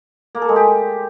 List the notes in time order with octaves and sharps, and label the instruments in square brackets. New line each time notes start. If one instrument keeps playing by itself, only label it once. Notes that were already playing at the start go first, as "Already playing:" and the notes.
[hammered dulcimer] A#3
A4
G#3
G4